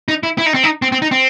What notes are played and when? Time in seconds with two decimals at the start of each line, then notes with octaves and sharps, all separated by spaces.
0.08 D#4
0.23 E4
0.38 E4
0.46 D#4
0.54 C4
0.63 D#4
0.82 C4
0.92 C4
1.02 D#4
1.11 C4